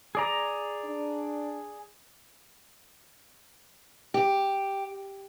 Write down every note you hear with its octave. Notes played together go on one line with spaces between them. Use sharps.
G#4 D5 A#5
D4
G4